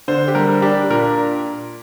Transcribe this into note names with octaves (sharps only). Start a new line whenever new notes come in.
D3 C5
G4
G3 A#4
D4 G4
A#2 A#4